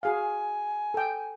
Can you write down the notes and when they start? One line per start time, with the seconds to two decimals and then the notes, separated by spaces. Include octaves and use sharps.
0.03 F#4 G#4 F5 G#5
0.94 A4 G5